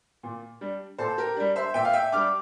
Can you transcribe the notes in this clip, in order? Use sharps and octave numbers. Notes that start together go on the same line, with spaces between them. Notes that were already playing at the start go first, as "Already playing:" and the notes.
A#2
G3 D4
A#2 A4 C5
G4 A#4
G3 D4
C5 E5
A#2 E5 G5
F5
E5 G5
G3 D4 D6 F6